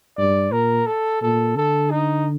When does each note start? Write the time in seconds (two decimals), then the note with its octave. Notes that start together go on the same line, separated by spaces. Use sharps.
0.18 G2 D5
0.52 A#2 A#4
0.87 A4
1.22 A#2 A4
1.56 D3 A4
1.91 D#4